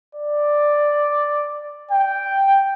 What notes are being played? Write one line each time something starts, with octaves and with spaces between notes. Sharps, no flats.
D5
G5